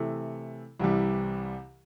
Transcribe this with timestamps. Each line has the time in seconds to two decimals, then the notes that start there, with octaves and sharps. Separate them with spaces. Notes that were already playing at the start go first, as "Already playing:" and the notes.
Already playing: C3 E3 A3
0.80 C2 C3 E3 G3